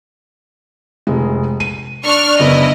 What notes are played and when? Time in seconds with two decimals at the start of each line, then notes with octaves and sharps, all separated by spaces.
1.07 F1 G#3
1.60 D#7
2.04 D4 C#6 F6
2.39 F#1 B3 D4 E4 D#5